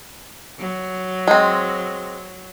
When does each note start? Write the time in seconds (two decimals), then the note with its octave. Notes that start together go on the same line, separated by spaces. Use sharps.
0.59 F#3
1.27 G#3 C4